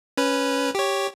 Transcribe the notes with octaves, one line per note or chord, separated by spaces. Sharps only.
C#4 B4
G4 C#5